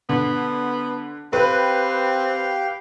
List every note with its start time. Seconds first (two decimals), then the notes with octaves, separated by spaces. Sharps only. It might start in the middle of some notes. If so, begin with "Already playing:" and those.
0.09 D3 B3
1.33 C4 G4 B4 F5 G5 B5